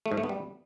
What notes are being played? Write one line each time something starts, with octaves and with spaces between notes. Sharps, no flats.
A3
G#2
A3
B3
G3